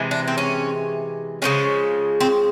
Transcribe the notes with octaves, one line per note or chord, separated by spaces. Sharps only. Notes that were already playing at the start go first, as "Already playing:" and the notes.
Already playing: C3 E3 G#3
D4
C4
C#4
C#3 F3 G#3 C#4
C4